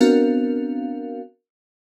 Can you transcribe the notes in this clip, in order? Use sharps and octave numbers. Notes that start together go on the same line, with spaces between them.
B3 C4 D4 F#4 A#4 F5